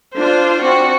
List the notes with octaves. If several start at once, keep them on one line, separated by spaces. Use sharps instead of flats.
D4 F4 C5
C4 F#4